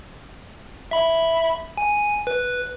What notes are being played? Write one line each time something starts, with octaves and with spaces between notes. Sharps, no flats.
E5 B5
G#5
B4